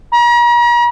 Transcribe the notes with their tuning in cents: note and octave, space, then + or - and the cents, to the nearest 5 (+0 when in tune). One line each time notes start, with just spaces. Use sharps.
A#5 +40